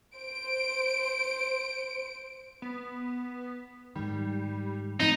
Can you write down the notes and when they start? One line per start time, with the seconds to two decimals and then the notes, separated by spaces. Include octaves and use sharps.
0.15 C5 D7
2.62 B3
3.95 G#2 D#3 G3
5.00 A2 F3 C4 D#4 D7